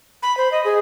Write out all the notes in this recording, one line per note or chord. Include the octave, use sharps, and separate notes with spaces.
B5
C5
D#5
G#4